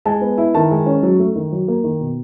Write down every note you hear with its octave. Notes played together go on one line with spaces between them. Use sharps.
G#3 A5
B3
E4
D#3 A5
G#3
C#4
F#3
A3
D#3
F#3
A#3
D#3
B2